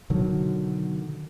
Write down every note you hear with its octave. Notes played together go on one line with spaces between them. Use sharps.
B2 D3 D#3 F#3